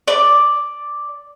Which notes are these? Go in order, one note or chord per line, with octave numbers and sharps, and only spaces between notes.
D5